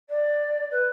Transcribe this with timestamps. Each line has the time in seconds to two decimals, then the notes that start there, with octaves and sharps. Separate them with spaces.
0.09 D5
0.71 B4